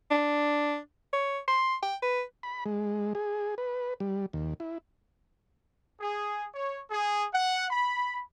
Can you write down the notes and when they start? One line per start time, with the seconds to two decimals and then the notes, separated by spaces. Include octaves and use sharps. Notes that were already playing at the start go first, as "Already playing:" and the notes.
0.11 D4
1.13 C#5
1.48 C6
1.83 G5
2.02 B4
2.43 B5
2.66 G#3
3.15 G#4
3.58 B4
4.00 G3
4.33 D#2
4.60 E4
5.99 G#4
6.55 C#5
6.90 G#4
7.33 F#5
7.71 B5